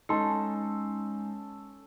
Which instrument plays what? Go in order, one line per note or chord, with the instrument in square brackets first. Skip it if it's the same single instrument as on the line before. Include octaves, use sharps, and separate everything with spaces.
[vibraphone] G#3 [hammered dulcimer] C#4 A4 [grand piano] D#4 C6